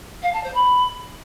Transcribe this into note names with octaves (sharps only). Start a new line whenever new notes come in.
F5
A5
C5
B5